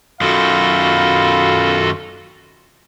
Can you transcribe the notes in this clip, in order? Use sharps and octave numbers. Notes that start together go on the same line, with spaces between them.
F#2 D#3 F4 F#4 A4 F5 B5